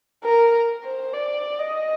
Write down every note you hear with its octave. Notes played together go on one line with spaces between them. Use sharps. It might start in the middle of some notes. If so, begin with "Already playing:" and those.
A#4
C5
D5
D#5